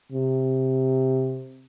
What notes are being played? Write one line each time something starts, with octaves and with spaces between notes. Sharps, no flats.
C3